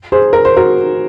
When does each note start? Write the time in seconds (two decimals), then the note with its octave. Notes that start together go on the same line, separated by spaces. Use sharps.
0.12 G#4 C5
0.33 A#4
0.45 C5
0.57 F#4 A#4